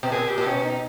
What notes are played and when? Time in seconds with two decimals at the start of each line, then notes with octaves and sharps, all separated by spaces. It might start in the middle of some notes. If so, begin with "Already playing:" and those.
0.03 B2
0.11 A#2 G#4
0.29 G4
0.38 A#2
0.47 B2 C#4
0.63 D#4